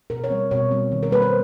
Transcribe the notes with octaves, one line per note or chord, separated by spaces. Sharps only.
B2 A#4
C#5
G3 C4
B2 C#5
G3 C4
D#3
A#4
G3 A#3 B4
C5